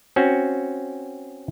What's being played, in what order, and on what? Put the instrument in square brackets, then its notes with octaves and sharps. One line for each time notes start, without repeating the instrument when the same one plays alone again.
[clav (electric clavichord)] C4 C#4 F#4